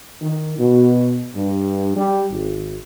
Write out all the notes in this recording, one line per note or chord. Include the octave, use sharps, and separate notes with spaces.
D#3
B2
G2
G3
G#1